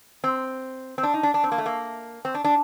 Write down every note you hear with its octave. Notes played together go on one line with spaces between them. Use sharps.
C4
C4
D4
D#4
D4
D4
C4
A#3
A3
A#3
C4
D4
D4